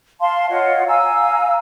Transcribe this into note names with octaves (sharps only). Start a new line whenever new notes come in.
F5 A5 C6
F4 C#5 D#5 F#5
F5 G#5 A#5 E6